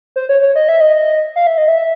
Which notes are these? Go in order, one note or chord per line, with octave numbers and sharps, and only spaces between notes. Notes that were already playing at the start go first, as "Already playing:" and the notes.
C5
C#5
C#5
D#5
E5
D#5
F5
E5
D#5
E5